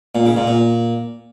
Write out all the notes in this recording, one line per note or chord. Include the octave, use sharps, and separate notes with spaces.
A#2
C#3
A#2
A#2